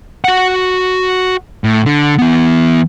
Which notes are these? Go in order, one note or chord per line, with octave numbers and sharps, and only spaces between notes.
F#4 F#5
A2
D3
E3 B3